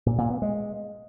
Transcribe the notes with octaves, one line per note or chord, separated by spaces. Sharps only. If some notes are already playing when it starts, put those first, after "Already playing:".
A#2
A#2
B3
G#3